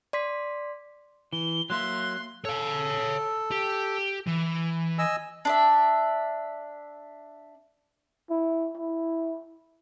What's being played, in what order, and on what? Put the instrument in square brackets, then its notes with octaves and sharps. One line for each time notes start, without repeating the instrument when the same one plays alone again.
[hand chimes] D5 C6 B6
[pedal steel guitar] E3 [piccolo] G7
[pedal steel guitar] F#3 A#3 E5 [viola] C6 [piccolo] F#6
[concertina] A4 [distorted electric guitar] C#5 F5
[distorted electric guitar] G4
E3
[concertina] D#5 G#5 E6
[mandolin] D4 D5 E5
[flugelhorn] E4
E4